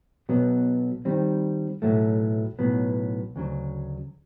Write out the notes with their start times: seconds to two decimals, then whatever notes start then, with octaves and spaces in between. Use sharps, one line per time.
0.29 B1 B2 F#3 B3
1.05 D#3 G3 C4
1.82 B1 A2 F#3 A3
2.59 B1 A2 F#3 B3
3.36 D2 C#3 F#3